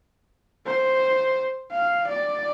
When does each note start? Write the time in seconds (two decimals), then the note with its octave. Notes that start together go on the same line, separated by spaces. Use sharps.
0.66 C5
1.71 F5
2.08 D5